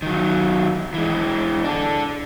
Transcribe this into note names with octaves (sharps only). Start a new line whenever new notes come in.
D#3 F#3
E3 G#3
D4 A4